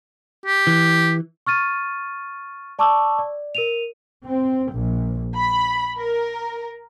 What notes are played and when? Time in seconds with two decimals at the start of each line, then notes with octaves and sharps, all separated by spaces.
0.46 G4
0.67 E3
1.46 C#6 F6 A6 D#7
2.79 D5 A5 C#6 D6 E6
3.19 D5
3.55 A#4 D#7 F7
4.25 C4
4.74 A#1
5.35 B5
5.97 A#4